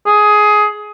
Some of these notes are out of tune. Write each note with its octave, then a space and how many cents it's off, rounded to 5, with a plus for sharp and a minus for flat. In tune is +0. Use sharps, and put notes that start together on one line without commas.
G#4 +15